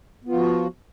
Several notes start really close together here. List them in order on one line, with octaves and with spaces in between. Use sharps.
B3 F4 F3 F#4